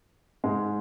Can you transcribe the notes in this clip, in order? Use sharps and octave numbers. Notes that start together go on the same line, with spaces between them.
G#2 G#3